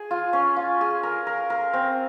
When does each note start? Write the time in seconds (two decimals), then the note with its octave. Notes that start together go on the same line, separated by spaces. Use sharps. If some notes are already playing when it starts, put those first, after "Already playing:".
Already playing: G#4
0.11 F4
0.33 C#4
0.56 F4
0.81 G#4
1.03 A#4
1.27 A#4
1.50 A#4
1.73 C4